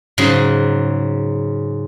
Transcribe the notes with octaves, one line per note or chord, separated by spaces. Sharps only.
G#2 C#3 F#3